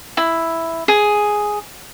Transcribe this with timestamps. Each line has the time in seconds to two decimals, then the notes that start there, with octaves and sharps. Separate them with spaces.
0.17 E4
0.88 G#4